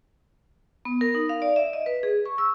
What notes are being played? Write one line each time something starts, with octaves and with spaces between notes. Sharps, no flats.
B3
A#4
D#4
F5
D5
E5
D#5
B4
G#4
C#6
E6